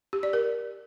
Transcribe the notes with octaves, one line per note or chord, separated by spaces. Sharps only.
G4
D5
A#4